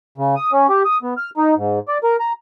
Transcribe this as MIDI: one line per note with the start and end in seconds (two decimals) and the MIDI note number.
0.18 0.35 49
0.36 0.51 87
0.53 0.67 61
0.69 0.83 67
0.85 0.98 87
1.03 1.14 59
1.17 1.30 89
1.37 1.55 63
1.57 1.79 44
1.88 1.98 74
2.04 2.16 70
2.20 2.32 82